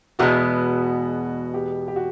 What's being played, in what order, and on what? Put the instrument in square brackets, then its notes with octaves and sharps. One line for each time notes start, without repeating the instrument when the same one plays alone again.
[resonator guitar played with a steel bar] E2 B2 G#3 B3 [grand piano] F#4
[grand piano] G4
G4
F#4